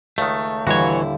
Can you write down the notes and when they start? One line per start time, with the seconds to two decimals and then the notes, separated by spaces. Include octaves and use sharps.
0.18 C#2 D#3 A3
0.67 D#2 A#2 D3 E3 G3 E4 F#4 C#5